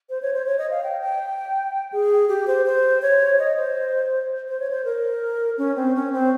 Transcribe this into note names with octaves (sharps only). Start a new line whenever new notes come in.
C5
C#5
C5
C#5
D#5
F5
G5
G5
G#4
G4
C5
C5
C#5
D#5
C5
C5
C#5
C5
A#4
C#4
C4
C#4
C4